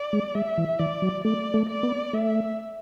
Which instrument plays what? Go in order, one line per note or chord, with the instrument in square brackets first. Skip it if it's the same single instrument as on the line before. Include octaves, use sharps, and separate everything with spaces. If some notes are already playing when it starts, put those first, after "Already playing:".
Already playing: [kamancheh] D5
[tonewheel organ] G#3
[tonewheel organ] G#3 [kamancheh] E5
[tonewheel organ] E3
[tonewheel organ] E3 [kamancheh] D5
[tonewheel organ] F#3
[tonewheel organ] A3 [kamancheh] D5
[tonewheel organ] A3
[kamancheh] D5
[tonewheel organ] B3
[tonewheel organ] A3 [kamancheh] E5